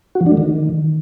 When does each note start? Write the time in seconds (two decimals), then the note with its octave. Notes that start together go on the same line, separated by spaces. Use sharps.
0.15 F#4
0.21 F3
0.26 D4
0.32 A3
0.37 D#3